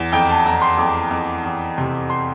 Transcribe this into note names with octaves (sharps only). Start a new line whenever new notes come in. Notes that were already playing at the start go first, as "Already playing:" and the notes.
Already playing: E2
F2 G5
A5
F2 A#5
C6
F2 D6
F2
E2
C3
C6